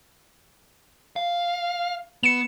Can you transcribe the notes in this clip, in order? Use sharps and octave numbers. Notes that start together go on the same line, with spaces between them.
F5
B3 C#7 E7